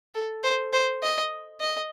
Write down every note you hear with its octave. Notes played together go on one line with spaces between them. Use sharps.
A4
C5
C5
D#5
D#5